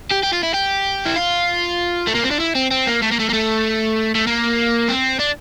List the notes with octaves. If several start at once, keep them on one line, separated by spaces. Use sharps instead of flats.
G4
G4
F4
E4
G4
E4
F4
A3
A#3
C4
D4
E4
C4
C4
A#3
A3
A#3
A3
A#3
A3
A3
A#3
C4
D4